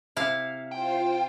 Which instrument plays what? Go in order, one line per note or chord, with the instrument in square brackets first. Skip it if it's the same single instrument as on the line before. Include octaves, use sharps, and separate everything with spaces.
[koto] C3 E4 F5
[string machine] F4 C5 [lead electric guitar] G5